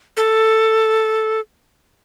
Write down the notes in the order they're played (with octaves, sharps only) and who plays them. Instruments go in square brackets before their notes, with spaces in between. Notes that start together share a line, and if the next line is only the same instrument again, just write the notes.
[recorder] A4